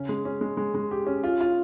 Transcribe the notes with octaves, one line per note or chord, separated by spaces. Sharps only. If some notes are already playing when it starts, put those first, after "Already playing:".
Already playing: C#3 C#4
G#3
C#4
G#3
G#3
G#3
G4
C#4
F4
F4